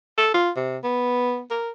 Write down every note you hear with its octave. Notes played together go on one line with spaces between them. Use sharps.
A4
F4
C3
B3
A#4